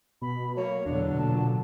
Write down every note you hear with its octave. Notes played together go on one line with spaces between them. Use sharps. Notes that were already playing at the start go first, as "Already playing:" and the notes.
B2 B5
F#3 A3 A#3 C#5
E2 B2 D3 F#3 D4
A#2 A5